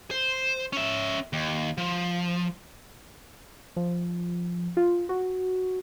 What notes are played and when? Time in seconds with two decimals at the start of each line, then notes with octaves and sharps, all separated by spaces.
0.11 C5
0.73 C#4 E5
1.33 D#2
1.78 F3
3.76 F3
4.77 F4
5.09 F#4